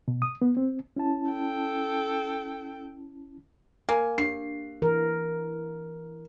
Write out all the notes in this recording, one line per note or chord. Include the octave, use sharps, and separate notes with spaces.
B2
D#6
B3
C4
C#4 E4 A5
A4 G5
A#3 G#5
D4 G4 C7
E3 A#4